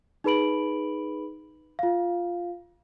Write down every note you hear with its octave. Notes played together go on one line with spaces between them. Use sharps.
D#4 G#4 B4 B5 D7 F#7
F4 F5